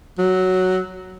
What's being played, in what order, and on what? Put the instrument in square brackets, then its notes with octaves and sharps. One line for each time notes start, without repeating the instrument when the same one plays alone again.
[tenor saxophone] F#3